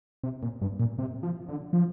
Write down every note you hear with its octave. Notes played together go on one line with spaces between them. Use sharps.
C3
A#2
G2
A#2
C3
F3
D3
F3